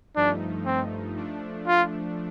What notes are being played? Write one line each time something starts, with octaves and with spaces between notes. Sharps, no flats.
G2 F3 A3 D4 D#4
C4
F3 A3 D4
F4